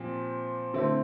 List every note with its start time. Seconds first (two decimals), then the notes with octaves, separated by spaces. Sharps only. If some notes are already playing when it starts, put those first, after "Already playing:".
Already playing: A#2 F3 C4 G4
0.74 D3 A3 C4 E4